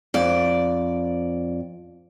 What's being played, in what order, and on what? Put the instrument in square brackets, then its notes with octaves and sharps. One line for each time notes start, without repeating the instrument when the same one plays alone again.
[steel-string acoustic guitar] F2 D5